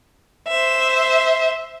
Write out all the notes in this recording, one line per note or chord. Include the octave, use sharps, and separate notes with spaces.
C5 E5